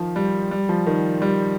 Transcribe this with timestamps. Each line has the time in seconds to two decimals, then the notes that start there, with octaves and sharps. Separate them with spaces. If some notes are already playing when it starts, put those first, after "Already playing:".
Already playing: D#3 F3
0.16 G3
0.51 G3
0.69 F3
0.87 D#3
1.22 G3